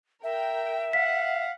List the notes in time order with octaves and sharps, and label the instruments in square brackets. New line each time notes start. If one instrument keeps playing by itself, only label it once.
[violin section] A#4 G5 [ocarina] E5
[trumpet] F5 [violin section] F#5 [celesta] B6